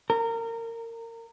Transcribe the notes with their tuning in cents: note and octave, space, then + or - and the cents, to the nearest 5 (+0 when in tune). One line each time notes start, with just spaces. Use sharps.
A#4 -25